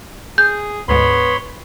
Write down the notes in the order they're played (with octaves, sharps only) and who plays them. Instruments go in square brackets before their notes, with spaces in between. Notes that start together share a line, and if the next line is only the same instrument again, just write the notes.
[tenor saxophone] G#4 [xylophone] G6
[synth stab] D2 G#2 [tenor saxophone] B3 [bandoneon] C#5 B5 C6